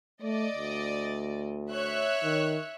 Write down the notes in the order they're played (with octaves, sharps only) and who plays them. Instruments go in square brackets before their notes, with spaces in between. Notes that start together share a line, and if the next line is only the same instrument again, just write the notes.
[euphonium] A3 [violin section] D5 D#5
[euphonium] D2
[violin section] C#5 E5 F#6
[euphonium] D#3